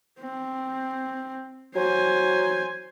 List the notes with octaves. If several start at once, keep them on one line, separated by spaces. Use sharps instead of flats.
C4
F#3 C5 G#5